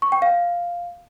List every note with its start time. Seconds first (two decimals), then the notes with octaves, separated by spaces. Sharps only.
0.02 C#6
0.12 G5
0.22 F5